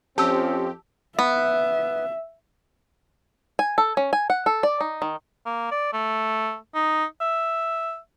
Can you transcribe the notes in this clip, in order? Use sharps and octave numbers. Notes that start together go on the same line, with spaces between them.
F2 F3 C4 C#4 G4 A5 E6
B3 E5
G#5
A4
C#4
G#5
F#5
A4
D5
D#4
D#3
A#3
D5
A3
D#4
E5